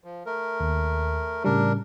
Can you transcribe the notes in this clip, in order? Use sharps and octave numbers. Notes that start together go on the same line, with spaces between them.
F3
A3 A#4
D#2
A2 C#3 G3 D4 A#4